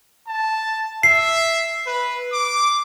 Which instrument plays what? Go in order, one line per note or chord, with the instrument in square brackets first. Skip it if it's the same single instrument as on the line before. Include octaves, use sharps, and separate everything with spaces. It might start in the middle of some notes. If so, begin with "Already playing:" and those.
[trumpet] A5
[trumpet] E5 [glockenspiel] C7
[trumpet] B4
D6